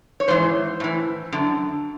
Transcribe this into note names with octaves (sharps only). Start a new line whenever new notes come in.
C#5
G#2 E3 C5
A2 E3
F#2 D3